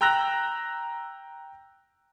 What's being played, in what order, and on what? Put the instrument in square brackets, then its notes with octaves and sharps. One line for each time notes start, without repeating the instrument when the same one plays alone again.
[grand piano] G5 A#5 E6 F#6 A#6 F7